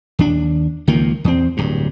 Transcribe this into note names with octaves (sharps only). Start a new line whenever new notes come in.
D#2 D4
C#2 D#3 F3 A#3
E2 C4
D1 G2